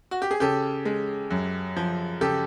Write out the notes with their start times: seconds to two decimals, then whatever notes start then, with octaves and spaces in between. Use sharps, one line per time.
0.11 F#4
0.22 G4
0.31 G#4
0.40 C#3 G4 A4
0.85 G#3
1.31 F#2
1.76 F3
2.21 C#3 G4 A4